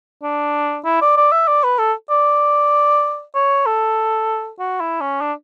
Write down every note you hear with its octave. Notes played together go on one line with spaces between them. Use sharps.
D4
E4
D5
D5
E5
D5
B4
A4
D5
C#5
A4
F#4
E4
C#4
D4